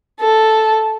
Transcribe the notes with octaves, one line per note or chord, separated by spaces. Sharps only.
A4